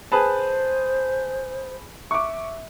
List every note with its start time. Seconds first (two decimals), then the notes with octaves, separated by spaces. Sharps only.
0.12 G#4 B4 C5 A5
2.11 E5 C#6 D6